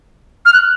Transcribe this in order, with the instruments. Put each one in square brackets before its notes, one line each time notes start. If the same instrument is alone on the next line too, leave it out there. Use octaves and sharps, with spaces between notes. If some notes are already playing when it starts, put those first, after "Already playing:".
[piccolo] F6
F#6